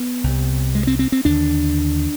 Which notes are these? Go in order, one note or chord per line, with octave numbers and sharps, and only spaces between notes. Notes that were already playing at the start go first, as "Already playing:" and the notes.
Already playing: B3
C2 C3
G#3
C4
C4
C4
D#2 D3 D4